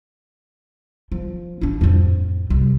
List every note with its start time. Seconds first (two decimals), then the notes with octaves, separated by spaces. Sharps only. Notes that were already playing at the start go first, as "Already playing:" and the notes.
1.12 F3
1.61 D4 E4
1.81 F2 A2
2.50 C2